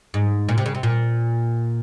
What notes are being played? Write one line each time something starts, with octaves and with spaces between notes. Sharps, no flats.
G#2
A#2
C3
C#3
C3
A#2